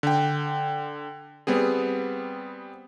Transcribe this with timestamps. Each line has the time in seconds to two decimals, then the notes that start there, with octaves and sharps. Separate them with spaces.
0.03 D3 G5
1.47 G3 B3 C4 G#4